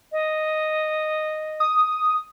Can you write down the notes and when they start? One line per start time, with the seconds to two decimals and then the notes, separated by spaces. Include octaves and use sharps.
0.12 D#5
1.60 D#6